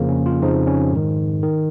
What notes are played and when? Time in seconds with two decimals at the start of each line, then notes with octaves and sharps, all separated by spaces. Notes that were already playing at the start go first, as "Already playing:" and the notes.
Already playing: F2 C#3 F3 A#3
0.09 C#4
0.26 F4
0.42 F2 C#3 F3 D#4
0.67 C#4
0.92 G#2 D#3
1.43 D#3